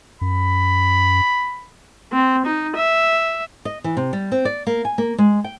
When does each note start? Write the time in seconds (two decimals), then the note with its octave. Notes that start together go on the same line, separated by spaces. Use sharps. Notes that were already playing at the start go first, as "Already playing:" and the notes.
0.21 F#2 B5
2.12 C4
2.46 D#4
2.77 E5
3.65 D#5
3.84 E3
3.97 C3
4.13 G3
4.32 C4
4.45 D5
4.67 A#3
4.85 G#5
4.98 A#3
5.18 G#3
5.44 G5